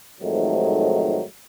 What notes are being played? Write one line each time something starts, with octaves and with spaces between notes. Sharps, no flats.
F2 G#2 D#3 F#3 A3